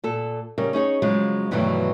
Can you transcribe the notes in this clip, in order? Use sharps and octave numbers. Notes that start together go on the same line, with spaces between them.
A#2 A4
C#3 G3 A#4
C#4 D#4 G#4 C#5
C#3 F3 F#3 G#3
G2 B2 D#3 E3 F#3 A3